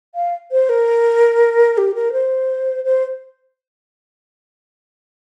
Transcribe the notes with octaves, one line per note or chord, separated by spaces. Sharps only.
F5
C5
A#4
G4
A#4
C5
C5